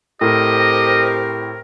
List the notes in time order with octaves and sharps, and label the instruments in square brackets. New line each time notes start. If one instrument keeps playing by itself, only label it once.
[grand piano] A2 [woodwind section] C4 G4 A#4 [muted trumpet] D#5